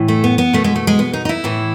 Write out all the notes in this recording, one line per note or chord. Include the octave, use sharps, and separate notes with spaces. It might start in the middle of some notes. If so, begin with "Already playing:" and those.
Already playing: A2 E3
A3
B3
B3
B2 A3
G#3
A3
G#3
B3
D#4
D#4
E4
A2 E3